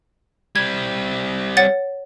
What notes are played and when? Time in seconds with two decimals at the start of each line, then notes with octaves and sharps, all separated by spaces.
0.56 G3 C4 G#6
1.57 C#5 F#5 A6